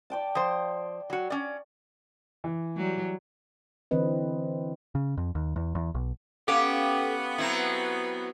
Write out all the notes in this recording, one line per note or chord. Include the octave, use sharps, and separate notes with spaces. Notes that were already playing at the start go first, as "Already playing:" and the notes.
D5 G5 A5
F3 C5
F#3 F#4
C#4 D5
E3
F#3 G3
D3 E3 C4 B4 D#5
C#3
F2
D#2
E2
E2
B1
B3 C#4 G4 A4 F5
F#3 C4 E4